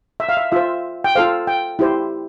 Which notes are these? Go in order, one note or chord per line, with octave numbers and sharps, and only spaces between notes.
E5
F5
E5
F4 C5 E5
G5
F4 A4 C5 F5
G5
E4 G4 C5